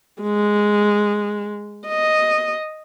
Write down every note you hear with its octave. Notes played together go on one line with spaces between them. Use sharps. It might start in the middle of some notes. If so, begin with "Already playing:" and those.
G#3
D#5